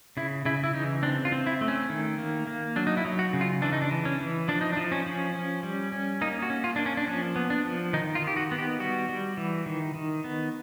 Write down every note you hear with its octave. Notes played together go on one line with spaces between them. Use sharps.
C#3 E4
C#3 E4
E4
E3 D#4
C4 D4
F4
C4
E4
A3
C#4
D#3
A#3
A#3
F#3 D4
D#4
E4
F#3
F#4
C#3
F4
E3 D4
D#4
D4
E3
C#4
E3
F3 D4
D#4
D4
F3
C#4
F3
C#4
G3
C#4
A#3 D#4
F#4
C#4
F4
A#3 D4
C#4
D4
F3 C#4
B3
D4
F3
D#3 D#4
F4
D#3
G4
F#4
B3
G4
G3 F#4
G3
E3
D#3
D#3
B3